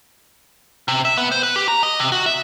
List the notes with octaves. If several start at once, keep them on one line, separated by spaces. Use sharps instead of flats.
C3
E5
B3
C5
B4
G4
A#5
D#5
C3
F#4
E5